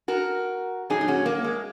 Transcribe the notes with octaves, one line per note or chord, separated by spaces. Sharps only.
F#4 A#4
A#2 F#3 D#4 G#4
D#4
C#4 F#4
A#3
G#3